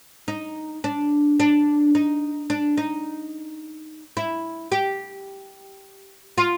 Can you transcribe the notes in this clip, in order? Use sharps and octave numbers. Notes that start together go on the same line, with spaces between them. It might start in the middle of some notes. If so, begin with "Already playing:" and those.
D#4
D4
D4
D#4
D4
D#4
E4
G4
F4